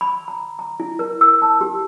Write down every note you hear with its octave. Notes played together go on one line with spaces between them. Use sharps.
B5
A#5
A#5
E4
A#4
E6
A5
G4